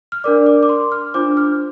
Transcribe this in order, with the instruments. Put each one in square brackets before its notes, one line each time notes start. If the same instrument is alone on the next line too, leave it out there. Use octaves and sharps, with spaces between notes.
[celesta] F6
D4 A#4 D5 D6
D6
D6
C6
F6
D4 F4 C5 D6
F6